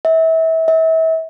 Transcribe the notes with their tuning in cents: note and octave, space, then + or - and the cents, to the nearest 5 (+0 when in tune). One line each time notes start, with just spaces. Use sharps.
E5 -30
E5 -35